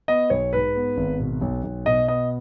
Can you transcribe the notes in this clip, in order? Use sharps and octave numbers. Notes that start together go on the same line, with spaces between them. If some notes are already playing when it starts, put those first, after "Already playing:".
B3 D#5
B1 C#5
G#2 B4
B3
G#1
B2
B1
B1
B2 D#5
B3 D#5